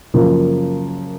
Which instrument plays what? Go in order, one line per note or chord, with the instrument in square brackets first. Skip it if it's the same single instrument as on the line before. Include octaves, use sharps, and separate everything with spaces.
[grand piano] F#2 C#3 F3 A#3 F4